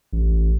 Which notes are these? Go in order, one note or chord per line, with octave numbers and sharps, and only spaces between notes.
A1